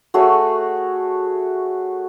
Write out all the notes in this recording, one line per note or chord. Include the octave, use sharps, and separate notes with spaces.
A3 F#4 G#4 C#5